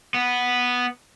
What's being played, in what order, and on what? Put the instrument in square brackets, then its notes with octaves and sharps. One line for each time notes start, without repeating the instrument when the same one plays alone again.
[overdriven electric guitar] B3